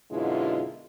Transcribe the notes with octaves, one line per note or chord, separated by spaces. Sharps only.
F#2 B2 D3 G#3 E4 F4